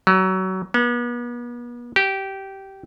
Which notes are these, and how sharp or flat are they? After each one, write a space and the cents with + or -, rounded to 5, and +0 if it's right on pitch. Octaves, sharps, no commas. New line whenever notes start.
F#3 +25
B3 -40
G4 -15